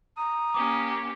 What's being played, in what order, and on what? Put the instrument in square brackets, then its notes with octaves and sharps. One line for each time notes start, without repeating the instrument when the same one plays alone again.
[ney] A#5 [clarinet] D#6
[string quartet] A#3 C#4 G4 [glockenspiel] D6